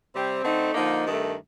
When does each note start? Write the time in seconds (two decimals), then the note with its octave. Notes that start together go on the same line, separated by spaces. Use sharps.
0.13 C3 G3 C4
0.44 D3 A3 C4 D#4
0.74 D3 F3 A#3 D#4
1.05 G2 D#3 A3